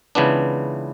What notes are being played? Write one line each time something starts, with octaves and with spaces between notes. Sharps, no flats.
C#2 C#3 E3 B3 D4